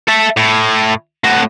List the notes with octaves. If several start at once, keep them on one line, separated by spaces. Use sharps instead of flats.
A4 E5
A2
A2 F#4